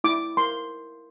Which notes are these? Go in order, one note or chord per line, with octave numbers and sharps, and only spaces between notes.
E4 D6
A#4 C6